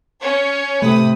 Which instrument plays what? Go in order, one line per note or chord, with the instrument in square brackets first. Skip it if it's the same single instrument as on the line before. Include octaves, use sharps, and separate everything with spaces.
[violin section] C#4 C#5
[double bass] C3 [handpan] A3 [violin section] B4 D#6